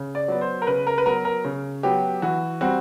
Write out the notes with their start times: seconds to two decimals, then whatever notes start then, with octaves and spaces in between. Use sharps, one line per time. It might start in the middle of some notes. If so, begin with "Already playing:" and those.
Already playing: C#3
0.15 D5
0.28 F#3 B3
0.41 C5
0.62 A#4
0.67 C#3 B4
0.87 A#4
0.98 B4
1.06 F#3 B3 A#4
1.25 A#4
1.45 C#3
1.83 F#3 B3 G4
2.22 E3 F#4
2.61 G3 C4 F#4